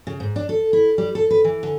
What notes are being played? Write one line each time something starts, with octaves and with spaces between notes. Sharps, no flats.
C#3
G#2
D4
A4
E4
G3
A4
B4
E3
D3